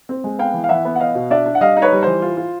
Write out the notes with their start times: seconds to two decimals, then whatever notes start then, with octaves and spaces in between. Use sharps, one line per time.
0.09 C4
0.24 G#3
0.39 B3 F5 G5
0.54 E3
0.64 F5
0.69 E3 E5 F#5
0.85 B3
0.96 F#5
1.00 B3 D#5 F5
1.15 B2
1.30 D4 D5 E5
1.46 D4
1.55 F#5
1.61 G3 D#5 F5
1.77 D#4
1.82 B4 C#5
1.92 G3
2.03 E3 C5
2.22 F4
2.37 F4